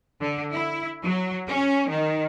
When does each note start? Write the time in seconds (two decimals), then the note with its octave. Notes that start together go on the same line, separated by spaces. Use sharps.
0.20 D3
0.52 E4
1.03 F#3
1.48 C#4
1.89 D#3